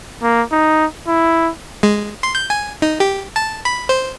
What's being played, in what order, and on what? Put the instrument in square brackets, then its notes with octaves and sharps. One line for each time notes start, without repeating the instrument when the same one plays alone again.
[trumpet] A#3
D#4
E4
[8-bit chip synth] G#3
C6
G6
G#5
D#4
G4
A5
B5
C5